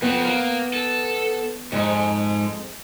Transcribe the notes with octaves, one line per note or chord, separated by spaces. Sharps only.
F2 B3 C4
A#3
A4
F2 G#2 G#3